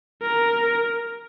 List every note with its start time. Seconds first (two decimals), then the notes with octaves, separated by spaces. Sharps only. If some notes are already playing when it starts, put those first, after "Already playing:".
0.22 A#4